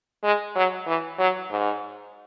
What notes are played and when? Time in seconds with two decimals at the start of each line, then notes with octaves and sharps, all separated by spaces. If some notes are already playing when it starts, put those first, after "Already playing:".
0.24 G#3
0.55 F#3
0.87 E3
1.19 F#3
1.50 G#2